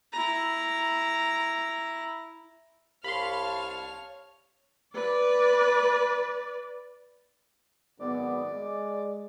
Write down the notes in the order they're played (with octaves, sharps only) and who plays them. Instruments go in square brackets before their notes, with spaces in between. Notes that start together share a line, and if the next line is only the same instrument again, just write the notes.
[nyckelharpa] E4 A#5
[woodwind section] C2 [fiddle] C#5 F6 [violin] F5 A5 [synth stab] B5 C6
[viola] B4 D5
[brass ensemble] G#1 F#2 B3 [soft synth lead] D5
[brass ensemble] G#3